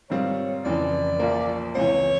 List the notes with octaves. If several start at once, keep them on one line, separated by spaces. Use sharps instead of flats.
G#2 D#3 G3 C4 F4 C#5
F1 F2 C#3 E3 D5
A#1 A#2 F3 A#3
C#2 C3 E3 C#5